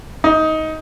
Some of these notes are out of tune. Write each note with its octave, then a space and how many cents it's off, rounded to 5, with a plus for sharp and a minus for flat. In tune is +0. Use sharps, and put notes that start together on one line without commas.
D#4 +15